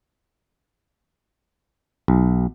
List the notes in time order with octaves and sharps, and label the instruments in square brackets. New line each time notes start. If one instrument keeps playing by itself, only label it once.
[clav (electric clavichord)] B1